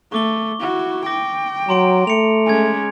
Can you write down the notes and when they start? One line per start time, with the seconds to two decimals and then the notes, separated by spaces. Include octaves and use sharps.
0.12 A3 C#6 D6 G7
0.60 E4 F#4
1.06 G5 D6 A#6
1.69 F#3 A#5 C6 D7
2.07 A3 C#7 F7
2.47 G#3 C#4 G#5 G#6